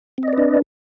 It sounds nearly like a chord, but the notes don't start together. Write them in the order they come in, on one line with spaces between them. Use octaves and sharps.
C4 D#5 D5 B4 D4